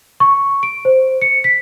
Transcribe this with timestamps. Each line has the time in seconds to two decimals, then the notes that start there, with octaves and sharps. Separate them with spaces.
0.20 C#6
0.63 D7
0.85 C5
1.22 C#7
1.44 B6